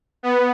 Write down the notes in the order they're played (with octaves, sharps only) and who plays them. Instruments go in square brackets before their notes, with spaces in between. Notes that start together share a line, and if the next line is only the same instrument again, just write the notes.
[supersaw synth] B3